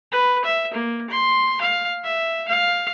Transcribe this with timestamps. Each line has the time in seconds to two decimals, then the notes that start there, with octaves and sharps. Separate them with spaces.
0.12 B4
0.45 E5
0.74 A#3
1.10 C6
1.61 F5
2.04 E5
2.48 F5